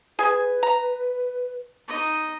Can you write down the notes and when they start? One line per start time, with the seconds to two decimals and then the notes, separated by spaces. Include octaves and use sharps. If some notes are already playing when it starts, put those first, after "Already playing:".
0.19 G#4 B4 G#5
0.63 A#5
1.88 D#4 D#5